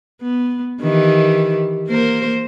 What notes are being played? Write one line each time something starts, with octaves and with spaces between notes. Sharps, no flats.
B3
D#3 E3 G4
A#3 A#4 C5